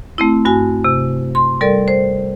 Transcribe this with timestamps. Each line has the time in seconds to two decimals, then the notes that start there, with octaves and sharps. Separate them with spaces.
0.18 A3 C4 E4
0.45 G2 F#4 G#5
0.84 C3
1.35 C6
1.61 G3 A4 A#4 D5
1.88 C5